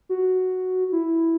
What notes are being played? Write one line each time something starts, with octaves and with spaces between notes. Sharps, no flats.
F#4
E4